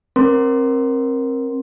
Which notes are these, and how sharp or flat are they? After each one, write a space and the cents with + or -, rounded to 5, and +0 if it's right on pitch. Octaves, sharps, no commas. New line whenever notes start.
C4 +30 A#4 +10 C6 +0